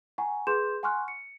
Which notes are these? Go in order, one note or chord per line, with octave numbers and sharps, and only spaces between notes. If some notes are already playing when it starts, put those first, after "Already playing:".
F#5 G#5 A#5 C#6
G#4 B4 C6 G6 E7
F#5 G#5 C6 C#6 F6 F#6
C#7